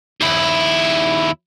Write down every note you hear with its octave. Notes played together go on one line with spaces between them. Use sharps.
D#2 E4